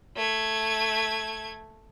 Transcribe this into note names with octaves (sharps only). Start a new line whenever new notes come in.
A3 G#6